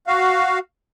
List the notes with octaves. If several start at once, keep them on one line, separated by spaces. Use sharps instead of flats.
F#4 F5